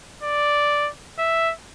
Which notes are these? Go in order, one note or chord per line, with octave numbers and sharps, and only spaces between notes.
D5
E5